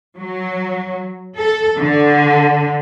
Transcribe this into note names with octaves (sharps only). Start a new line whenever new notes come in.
F#3
A4
D3